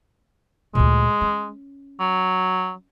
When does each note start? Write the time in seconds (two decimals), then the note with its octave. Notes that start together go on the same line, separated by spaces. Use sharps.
0.75 D2 A#2 G#3
1.21 C#4
2.00 F#3